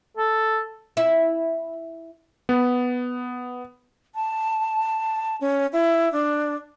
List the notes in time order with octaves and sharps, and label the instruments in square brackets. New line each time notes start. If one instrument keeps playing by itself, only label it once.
[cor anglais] A4
[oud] E4
[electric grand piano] B3
[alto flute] A5
C#4
E4
D4